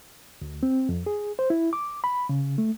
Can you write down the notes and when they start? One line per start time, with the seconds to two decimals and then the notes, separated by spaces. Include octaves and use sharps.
0.42 D2
0.63 C4
0.89 F2
1.06 G#4
1.39 C5
1.50 E4
1.73 D6
2.04 B5
2.29 C#3
2.58 A3